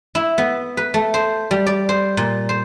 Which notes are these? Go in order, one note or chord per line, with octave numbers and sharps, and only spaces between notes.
E4
B3
B4
A3
C5
G3
D5
C5
A#2
C5